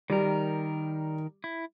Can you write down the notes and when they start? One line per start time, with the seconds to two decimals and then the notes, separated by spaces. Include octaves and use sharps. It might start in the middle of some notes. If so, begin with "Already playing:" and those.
0.10 D#3 G3 A#4
1.44 E4